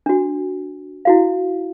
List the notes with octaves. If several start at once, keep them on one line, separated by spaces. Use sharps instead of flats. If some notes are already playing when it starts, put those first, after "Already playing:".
D4 F#4
E4 F#4 F5